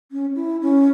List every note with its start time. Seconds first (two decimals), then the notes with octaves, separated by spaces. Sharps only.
0.12 C#4
0.35 E4
0.61 C#4